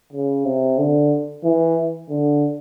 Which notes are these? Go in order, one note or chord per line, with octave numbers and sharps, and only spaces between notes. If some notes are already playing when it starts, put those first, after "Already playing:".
C#3
C3
D3
E3
D3